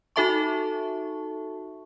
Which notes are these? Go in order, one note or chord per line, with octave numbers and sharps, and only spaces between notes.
D#4 F#4 A4 E5 A5 C#6